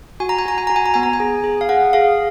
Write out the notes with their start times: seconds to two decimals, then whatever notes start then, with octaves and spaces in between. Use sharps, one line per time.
0.20 F#4 G#5
0.29 A#5
0.39 G#5
0.46 F#4 A#5
0.58 G#5
0.67 F#4 A#5
0.76 G#5
0.86 A#5
0.94 B3 G#5
1.03 A#5
1.13 G#5
1.20 G#4
1.44 G#4
1.61 F5
1.69 G#4 F#5
1.93 G#4 F5